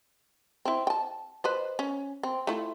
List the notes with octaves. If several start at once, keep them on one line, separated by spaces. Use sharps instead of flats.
C4 E4
G5 A5
B4 C5 D#5
C#4
C4
A3 E4 F4